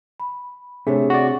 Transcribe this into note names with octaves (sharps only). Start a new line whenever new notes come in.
B5
C3 A3 C4 D4 G#4 C#5
F#4 D5